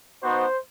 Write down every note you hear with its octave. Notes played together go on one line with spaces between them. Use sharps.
B3 D#4 F#4 C5